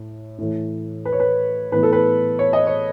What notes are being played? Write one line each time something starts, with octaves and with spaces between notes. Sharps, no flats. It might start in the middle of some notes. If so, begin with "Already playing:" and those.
Already playing: A2
A2 E3 A3
B4
C#5
B4
A2 E3 B3 B4
A4
B4
C#5
D#5
C#5